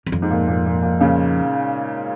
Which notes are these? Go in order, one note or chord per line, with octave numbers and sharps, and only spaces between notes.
E2
F2
G#2
A#2
A#2
A#2
A#2
A#2 C#3